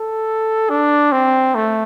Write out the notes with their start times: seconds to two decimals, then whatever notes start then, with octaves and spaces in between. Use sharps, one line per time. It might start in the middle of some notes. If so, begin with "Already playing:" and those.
Already playing: A4
0.70 D4
1.12 C4
1.55 A3